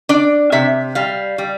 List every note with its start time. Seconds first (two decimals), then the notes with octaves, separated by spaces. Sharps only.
0.09 D4 D5
0.52 C3 E5
0.95 G3 F5
1.38 G3